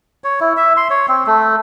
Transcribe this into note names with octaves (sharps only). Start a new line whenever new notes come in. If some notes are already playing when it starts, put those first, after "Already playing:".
C#5
E4
E5
C6
C#5
C4
A3